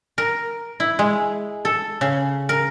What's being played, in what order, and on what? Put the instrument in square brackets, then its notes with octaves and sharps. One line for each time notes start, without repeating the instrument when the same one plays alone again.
[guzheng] A#4
E4
G#3
A4
C#3
A#4